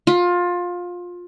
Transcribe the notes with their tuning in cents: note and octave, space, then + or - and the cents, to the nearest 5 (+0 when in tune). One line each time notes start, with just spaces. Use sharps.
F4 +20